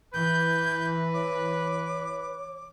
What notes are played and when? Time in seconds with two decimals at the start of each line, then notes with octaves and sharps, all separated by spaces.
0.14 E3 B4 G6
1.14 C#5 D6